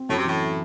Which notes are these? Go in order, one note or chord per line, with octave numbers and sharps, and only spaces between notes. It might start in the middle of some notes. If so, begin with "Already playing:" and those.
Already playing: C4
F#2 A2
C3
A2 E3